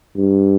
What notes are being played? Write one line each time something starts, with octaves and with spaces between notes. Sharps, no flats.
G2